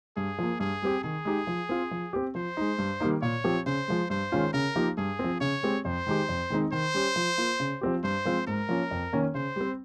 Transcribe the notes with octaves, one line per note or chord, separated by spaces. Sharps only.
G2 G#4
F3 A#3
G2 G#4
G3 C4 G4
D#3 G#4
G#3 D#4 G4
F3
C4 F4
F3
C4 G4
F3 C5
G#3 D#4
G2
D#3 G3 A#3 D#4
A#2 C#5
F3 C4 G4
C#3 C5
F3 G#3
G2 C5
D#3 G#3 C#4 F4
C#3 A#4
F3 A#3 D#4 G4
G2 G#4
F3 C4
C#3 C#5
G#3 C4 G4
F2 C5
D#3 G#3 D#4 G4
F2
D#3 G#3 C4 D#4
D#3 C5
G3 C#4 G4
F3
A#3 F4
C#3
F3 C4 G4
G2 C5
F3 G#3 C4 F4
G#2 A#4
F3 A#3 C#4
F2
D#3 A#3 C#4
C#3 C5
G3 C4